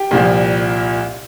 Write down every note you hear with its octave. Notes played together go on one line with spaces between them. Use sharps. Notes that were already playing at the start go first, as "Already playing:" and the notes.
Already playing: G4
C2 A#2 F3